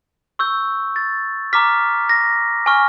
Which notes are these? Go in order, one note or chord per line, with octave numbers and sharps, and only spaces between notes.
C#6 E6 G6
A6
A#5 D6 F6 B6
A#6
G#5 C#6 F6